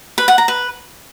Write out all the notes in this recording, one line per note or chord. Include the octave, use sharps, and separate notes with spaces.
B4
F#5
A#5
B4